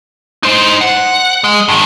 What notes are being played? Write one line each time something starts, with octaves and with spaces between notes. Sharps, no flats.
D#4 C5
F#5
G#3
G2 D#3